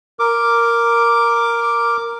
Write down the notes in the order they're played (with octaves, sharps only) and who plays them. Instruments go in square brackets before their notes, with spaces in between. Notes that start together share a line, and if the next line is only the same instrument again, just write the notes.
[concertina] A#4 D6